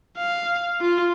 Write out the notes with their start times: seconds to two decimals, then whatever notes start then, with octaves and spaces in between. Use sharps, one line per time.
0.18 F5
0.81 F4